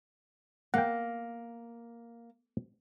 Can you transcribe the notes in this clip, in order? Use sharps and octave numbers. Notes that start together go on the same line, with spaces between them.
A#3 F#5 G5